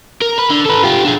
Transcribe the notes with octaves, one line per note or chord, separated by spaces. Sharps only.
A#4
B4
D3
A4 B4
F4 G4
D4 G#4